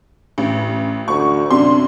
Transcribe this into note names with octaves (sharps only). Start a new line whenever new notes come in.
A1
D2 C#6
F#2 C3 D4 C6